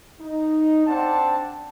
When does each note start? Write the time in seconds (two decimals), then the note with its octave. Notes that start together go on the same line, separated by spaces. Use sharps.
0.20 D#4
0.86 C4 D4 C5 D5 F#5 A5